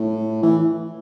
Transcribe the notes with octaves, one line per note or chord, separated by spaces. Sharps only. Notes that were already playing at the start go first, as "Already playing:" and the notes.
Already playing: A2
E3